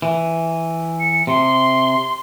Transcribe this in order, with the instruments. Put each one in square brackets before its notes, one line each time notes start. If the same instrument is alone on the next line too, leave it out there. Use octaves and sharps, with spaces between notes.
[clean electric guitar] E3
[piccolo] C#7
[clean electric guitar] C3 [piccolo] C6